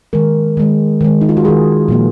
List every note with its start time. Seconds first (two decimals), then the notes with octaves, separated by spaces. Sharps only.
0.13 D#3 G#3 A#4
0.57 D#3 G#3
1.01 D#3 G#3
1.21 D#4
1.29 F4
1.37 F#4
1.44 D#3 G#3 G#4
1.88 A#2 F3 A#3